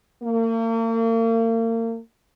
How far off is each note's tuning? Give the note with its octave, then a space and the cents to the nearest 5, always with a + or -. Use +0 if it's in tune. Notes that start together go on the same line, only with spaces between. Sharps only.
A#3 -40